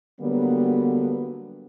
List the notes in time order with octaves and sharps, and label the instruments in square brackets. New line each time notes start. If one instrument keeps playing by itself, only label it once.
[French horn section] D3 F#3 G3 A#3 B3